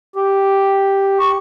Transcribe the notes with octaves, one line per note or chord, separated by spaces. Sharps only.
G4
C#6